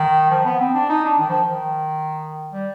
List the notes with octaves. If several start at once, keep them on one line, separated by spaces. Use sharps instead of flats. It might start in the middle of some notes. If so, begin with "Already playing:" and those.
Already playing: D#3
F3
B3
C4
D4
D#4
D4
D#3
F3
D#3
G3